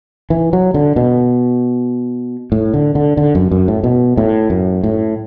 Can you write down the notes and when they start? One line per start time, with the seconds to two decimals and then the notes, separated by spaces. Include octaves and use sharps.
0.30 E3
0.53 F#3
0.74 D3
0.96 B2
2.52 A2
2.74 D3
2.95 D3
3.17 D3
3.35 F#2
3.51 F#2
3.68 A2
3.84 B2
4.17 A2
4.50 F#2
4.84 A2